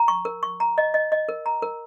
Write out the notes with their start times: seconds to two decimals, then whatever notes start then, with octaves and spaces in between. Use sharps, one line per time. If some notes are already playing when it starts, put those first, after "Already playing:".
Already playing: A#5
0.08 C#6
0.25 A#4
0.43 C#6
0.60 A#5
0.78 D#5
0.94 D#5
1.12 D#5
1.29 A#4
1.46 A#5
1.62 A#4